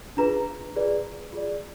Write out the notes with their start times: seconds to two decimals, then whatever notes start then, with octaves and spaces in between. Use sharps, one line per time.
0.17 D4 F4 G#4 B4 A#5
0.76 F4 G#4 B4 D5
1.33 F4 G#4 D5